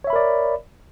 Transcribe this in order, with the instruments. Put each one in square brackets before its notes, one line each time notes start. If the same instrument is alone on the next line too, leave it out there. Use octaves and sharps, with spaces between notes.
[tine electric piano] C#5
E5
B5
A#4
D5